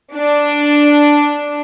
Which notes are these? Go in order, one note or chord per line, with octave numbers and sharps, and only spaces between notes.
D4